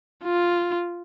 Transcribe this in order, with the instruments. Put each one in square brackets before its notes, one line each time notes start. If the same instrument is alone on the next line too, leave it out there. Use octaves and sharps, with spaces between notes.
[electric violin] F4